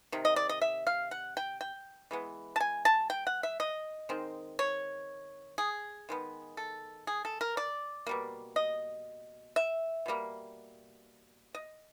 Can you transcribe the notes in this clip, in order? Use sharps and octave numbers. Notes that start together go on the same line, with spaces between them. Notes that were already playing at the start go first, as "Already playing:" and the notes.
C3 D#3
D#5
D5
D#5
E5
F5
F#5
G5
G5
E3 G#3 B3
A5
G#5
A5
G5
F#5
E5
D#5
D#3 G#3 C4
C#5
G#4
D#3 G#3 B3
A4
G#4
A4
A#4
D5
B2 G3 A#3
D#5
E5
B2 G3 A#3
D#5